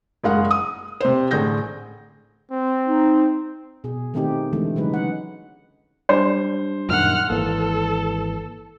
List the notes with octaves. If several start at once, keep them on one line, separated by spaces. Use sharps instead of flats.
F#1 G#3 F5 F#5
D#6
C3 C5
A1 D3 G#4 G6 A#6
C4
D#4
B2 G#4
D#3 A3 C4 D#4 G4
D3 E3 G#3 A3
C#3 F#3 G#3 D#4 B4
F#5
G3 D4 C5
F#2 A#2 D#3 F#5 F6
G#1 E3 A#3 A4